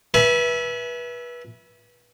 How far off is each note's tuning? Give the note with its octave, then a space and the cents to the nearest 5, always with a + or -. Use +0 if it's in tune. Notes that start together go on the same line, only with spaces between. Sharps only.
B4 -25 E5 +0 G#5 +35